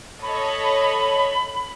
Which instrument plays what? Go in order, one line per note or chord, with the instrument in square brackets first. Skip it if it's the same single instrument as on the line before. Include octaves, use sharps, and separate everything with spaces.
[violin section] A4 C#5 D#5 [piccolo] B5